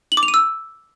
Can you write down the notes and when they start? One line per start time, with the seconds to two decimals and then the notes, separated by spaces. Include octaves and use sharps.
0.12 F#7
0.17 D6
0.23 F7
0.28 D#7
0.34 E6